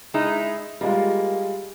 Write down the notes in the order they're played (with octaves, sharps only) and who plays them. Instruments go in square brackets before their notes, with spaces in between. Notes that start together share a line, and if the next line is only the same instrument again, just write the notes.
[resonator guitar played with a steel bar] G#3 D#4 E4
[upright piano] G3 G#3 F4 [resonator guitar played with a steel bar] A#3